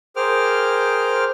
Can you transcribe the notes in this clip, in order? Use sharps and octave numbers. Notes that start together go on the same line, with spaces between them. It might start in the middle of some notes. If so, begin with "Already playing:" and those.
G#4 A#4 C5 G5 D6 F6